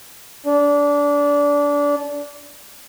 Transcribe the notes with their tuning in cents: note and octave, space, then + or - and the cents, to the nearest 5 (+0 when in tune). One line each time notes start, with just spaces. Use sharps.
D4 -20